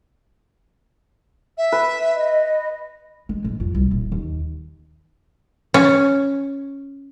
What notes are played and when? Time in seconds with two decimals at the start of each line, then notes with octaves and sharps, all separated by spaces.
1.58 E5
1.72 B4
2.13 D#5
3.29 G#3
3.44 G#2
3.60 F2
3.75 C2
3.91 D#1
4.12 D#2
5.74 C#4